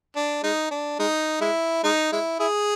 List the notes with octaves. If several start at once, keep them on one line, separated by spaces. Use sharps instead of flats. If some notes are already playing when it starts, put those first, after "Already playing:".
D4
G#3 D#4
D4
G#3 D#4
G#3 E4
G#3 D#4
G#3 E4
E4 G#4